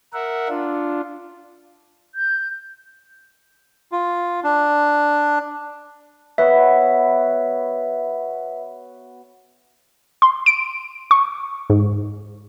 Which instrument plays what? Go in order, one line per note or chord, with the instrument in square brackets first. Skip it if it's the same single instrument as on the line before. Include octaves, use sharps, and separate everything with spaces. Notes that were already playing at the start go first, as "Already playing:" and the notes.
[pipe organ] A#4 E5 F#5
D4 F4
[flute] G6
[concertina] F4
D4
[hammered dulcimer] B3 F#4 C#5 [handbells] B4 E5
[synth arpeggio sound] C6
D7
C#6
G#2